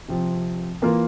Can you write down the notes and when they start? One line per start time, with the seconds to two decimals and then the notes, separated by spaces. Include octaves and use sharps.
0.08 C3 F3 C4
0.82 E3 A#3 F4 A#4